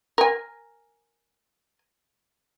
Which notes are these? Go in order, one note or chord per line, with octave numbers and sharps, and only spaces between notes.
A#4 G#5